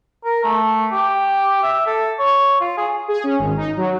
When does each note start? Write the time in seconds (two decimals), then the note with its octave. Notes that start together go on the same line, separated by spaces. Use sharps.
0.25 A#4
0.44 A3
0.92 G4
1.63 E5
1.87 A4
2.19 C#5
2.61 F4
2.77 G#4
3.08 G#4
3.24 C#4
3.39 G#1
3.57 D#4
3.77 F#3